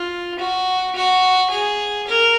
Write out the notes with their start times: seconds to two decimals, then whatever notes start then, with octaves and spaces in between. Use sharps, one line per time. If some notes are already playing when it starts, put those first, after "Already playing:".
Already playing: F4
0.39 F#4
0.96 F#4
1.51 G#4
2.07 A#4